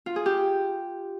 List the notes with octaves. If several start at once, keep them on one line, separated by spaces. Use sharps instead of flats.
F4
G#4
G4